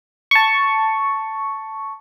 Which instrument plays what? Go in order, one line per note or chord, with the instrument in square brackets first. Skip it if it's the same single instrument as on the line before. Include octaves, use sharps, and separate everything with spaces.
[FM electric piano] A5 C#6